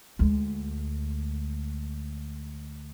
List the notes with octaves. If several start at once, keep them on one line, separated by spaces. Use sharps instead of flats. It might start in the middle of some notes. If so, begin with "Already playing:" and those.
D2 G#3